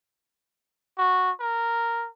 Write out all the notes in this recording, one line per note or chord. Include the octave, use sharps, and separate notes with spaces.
F#4
A#4